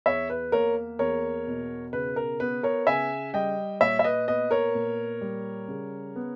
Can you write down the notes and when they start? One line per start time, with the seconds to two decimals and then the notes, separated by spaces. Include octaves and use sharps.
0.06 E2 C#5 E5
0.30 B4
0.52 A#3 A#4 C#5
0.99 E2 A#4 C#5
1.47 B2
1.93 C#3 B4
2.16 A#4
2.40 B3 B4
2.63 A#4 C#5
2.87 C#3 E5 G#5
3.33 G3 D#5 G5
3.80 A#2 C#5 E5
3.99 E5
4.04 B4 D#5
4.27 B3 B4 D#5
4.51 A#4 C#5
4.75 A#2
5.21 G3
5.68 C#3
6.16 B3